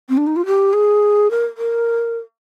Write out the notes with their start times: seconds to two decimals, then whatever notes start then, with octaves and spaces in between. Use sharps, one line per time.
0.09 C4
0.17 D4
0.27 D#4
0.36 F4
0.46 G4
0.73 G#4
1.31 A#4
1.58 A#4